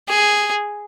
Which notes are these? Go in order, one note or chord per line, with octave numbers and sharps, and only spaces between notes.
G#4